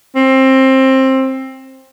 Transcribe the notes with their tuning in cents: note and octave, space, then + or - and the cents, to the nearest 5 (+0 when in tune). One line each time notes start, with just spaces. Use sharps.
C4 +20